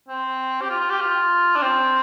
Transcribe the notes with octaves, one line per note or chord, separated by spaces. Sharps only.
C4
G4
F4
F4
G4
F4
D4
C4